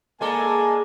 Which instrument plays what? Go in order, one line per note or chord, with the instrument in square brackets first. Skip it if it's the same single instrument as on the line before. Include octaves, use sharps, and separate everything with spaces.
[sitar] G#3 A4 [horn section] A#3 D5 G#5